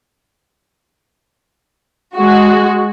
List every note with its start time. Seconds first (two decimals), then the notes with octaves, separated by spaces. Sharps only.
2.16 G#3 F#4